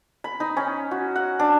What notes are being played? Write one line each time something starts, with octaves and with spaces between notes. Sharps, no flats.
B5
D#4
C#4
F#4
F#5
D4